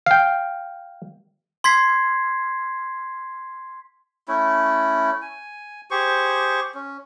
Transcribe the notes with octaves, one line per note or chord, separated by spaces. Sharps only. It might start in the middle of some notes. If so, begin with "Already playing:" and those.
F5 G5
C6 G#6 B6 C7
A3 C#4 E4
G#5
G4 G#4 C5 C#6
C#4